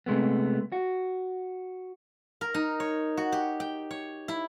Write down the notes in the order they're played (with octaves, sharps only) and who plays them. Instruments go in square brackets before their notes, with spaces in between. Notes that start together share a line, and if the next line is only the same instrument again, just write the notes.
[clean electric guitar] C3 G#3 A3 B3
F#4
[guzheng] A#4
D#4
C#5
F#4
G4
G5
C#5
E4